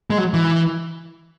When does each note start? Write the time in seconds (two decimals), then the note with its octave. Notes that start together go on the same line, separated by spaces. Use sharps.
0.10 G#3
0.18 F#3
0.34 E3